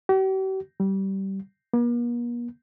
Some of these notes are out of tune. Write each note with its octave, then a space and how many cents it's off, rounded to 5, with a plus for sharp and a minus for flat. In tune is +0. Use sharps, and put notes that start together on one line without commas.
G4 -45
G3 -20
A#3 +45